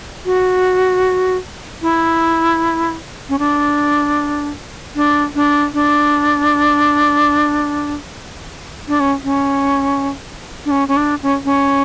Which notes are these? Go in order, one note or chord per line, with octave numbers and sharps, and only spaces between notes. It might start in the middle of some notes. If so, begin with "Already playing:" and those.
F#4
E4
C#4
D4
D4
D4
D4
D4
C#4
C#4
D4
C#4
C#4
D4
C#4
C#4